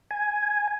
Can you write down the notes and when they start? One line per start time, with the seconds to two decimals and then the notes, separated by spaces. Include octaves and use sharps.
0.11 G#5